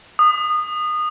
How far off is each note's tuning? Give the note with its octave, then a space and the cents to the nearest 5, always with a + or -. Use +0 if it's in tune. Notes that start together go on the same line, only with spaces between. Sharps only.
D#6 -25